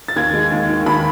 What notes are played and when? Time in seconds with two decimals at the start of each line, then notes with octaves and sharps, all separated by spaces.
0.08 A6
0.16 D#2 G#6
0.33 G#3
0.52 D#2
0.69 D#3
0.86 D#2 B5